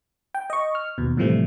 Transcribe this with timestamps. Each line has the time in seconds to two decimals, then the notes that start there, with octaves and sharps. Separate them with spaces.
0.35 G5
0.50 D#5 C#6
0.75 F6
0.98 D#2 B2
1.17 A2 C3 E3 F3 G3 A3